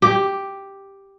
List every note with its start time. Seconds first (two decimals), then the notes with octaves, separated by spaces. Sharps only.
0.02 G4